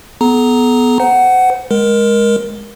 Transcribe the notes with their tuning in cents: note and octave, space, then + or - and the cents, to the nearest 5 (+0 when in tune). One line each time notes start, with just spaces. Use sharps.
B3 +0 A4 -40 A#5 +0
C5 -30 F#5 +10
G#3 +0 A#4 +15